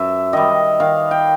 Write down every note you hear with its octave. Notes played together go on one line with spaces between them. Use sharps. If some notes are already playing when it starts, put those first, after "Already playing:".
Already playing: F#2 E5
D#3 G3 D#5
D#3 F5
G5